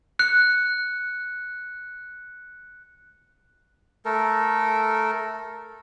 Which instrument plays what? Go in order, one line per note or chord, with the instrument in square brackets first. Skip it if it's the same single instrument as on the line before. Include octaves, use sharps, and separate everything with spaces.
[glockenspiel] F#6 C#7
[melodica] A3 A4 A#4